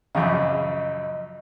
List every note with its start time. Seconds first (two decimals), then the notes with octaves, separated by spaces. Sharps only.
0.15 A#1 F#2 C#3 D#5